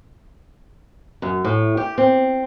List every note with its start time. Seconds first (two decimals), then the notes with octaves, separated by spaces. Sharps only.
1.22 F#2
1.45 A2
1.77 G4
1.98 C4